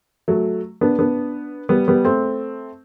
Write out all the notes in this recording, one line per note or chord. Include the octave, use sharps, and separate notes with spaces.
F#3 A3
B3 D4
B3 D4
G3 B3
G3 B3
A3 C4